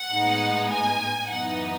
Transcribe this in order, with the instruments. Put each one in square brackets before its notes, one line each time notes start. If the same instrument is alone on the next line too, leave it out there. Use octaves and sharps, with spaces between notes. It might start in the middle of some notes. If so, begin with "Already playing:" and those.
Already playing: [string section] F#5
A2 G#3 B3 D#4
G#5
F#2 E3 B3 D#4 F#5